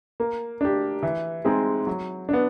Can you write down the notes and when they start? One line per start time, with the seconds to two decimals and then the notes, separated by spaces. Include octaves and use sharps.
0.20 A#3
0.61 D4 G4
1.03 E3
1.45 G#3 C4 D#4 G#4
1.87 F#3
2.29 B3 D4